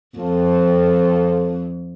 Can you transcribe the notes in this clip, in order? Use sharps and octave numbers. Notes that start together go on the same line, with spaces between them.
F2 C4 F4 A4